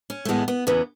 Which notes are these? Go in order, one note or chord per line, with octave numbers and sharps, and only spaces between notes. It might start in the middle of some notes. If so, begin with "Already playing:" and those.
C#4
A3
A2 E3 G#3 B3
B3
E2 C#3 E3 B3